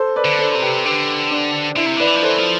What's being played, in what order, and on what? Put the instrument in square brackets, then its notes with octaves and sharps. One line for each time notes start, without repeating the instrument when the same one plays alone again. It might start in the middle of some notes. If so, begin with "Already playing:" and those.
Already playing: [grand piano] A4 C5
B4 D5
[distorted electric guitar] D3
[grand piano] A4 C5
[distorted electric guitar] C3 [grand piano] A4
[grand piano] G4 B4
[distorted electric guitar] D3 [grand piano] G4 B4
[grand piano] D4
[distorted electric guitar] D3 [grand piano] E4
[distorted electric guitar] C3
[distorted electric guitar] D3 [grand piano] B4 D5
[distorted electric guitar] E3
F3
[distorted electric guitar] E3 [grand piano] A4 C5
[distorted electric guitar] F3